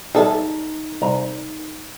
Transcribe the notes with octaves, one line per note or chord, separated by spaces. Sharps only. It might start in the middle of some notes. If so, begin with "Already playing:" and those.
B1 G3 D#4 G#4 A4 E5
C2 A#5